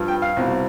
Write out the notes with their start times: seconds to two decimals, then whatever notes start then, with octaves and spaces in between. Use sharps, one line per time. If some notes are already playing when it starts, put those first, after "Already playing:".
Already playing: G2 F3
0.08 G5
0.22 F5
0.37 C2 B2